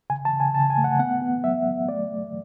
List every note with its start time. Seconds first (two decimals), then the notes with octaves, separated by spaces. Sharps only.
0.10 C#3 G#5
0.25 A5
0.33 C#3
0.40 G#5
0.55 C#3 A5
0.70 G#5
0.78 A3
0.84 F#5
0.99 B3 F#5
1.22 B3
1.44 F#3 E5
1.66 F#3
1.89 A3 D5
2.11 A3